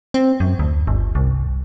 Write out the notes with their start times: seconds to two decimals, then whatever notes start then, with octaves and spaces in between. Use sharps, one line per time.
0.14 C4
0.40 F#2
0.59 D2
0.87 G1
1.15 C2